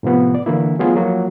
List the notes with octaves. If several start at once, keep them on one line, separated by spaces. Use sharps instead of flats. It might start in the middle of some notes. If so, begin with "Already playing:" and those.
A2 C3 F3 B3
D5
D3 E3 A#3 E4
F#3 A3 B3 F4 G#4
F3 F#3 A#3